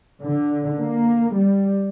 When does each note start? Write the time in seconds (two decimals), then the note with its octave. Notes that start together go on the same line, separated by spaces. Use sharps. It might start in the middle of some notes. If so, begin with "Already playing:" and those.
0.21 D3
0.80 A#3
1.38 G3